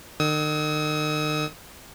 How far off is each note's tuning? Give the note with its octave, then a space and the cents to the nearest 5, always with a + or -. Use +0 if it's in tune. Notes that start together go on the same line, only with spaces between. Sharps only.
D#3 -40 D#6 +45